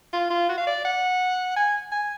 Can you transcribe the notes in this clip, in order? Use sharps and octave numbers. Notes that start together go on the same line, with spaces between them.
F4
F4
F#4
F5
D5
F#5
G#5
G#5